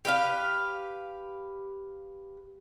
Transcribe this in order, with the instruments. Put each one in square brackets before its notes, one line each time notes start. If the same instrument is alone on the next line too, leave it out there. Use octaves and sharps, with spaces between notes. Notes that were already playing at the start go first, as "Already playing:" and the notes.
[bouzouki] G4 B4 E5 F5